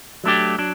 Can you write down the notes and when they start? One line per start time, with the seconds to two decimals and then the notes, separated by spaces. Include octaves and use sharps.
0.24 F#3 A3 D4 G4
0.59 F#3 D4